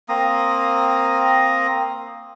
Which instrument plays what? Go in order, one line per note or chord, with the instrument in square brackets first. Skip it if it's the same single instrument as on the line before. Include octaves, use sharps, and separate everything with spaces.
[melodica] A#3 C4 A#5 D#6